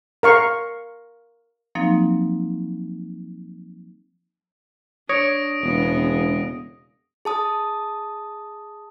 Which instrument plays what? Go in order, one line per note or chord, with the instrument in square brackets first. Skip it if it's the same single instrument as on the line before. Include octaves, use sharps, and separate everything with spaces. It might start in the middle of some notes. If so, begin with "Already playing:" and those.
[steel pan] A#4 F5 C#6
[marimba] F3 F#3 A#3 C4 D#4 F5
[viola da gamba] D4 [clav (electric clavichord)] C#5 [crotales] D#6 A#6 D7
[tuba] E1 [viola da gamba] C#3 G#3 B3
[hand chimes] G#4 A5 D#6